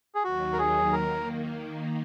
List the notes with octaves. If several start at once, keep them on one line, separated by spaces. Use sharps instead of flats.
G#4
D#2 D#3 F#3 F#4
A#4
G#4
D#3 A#3 A#4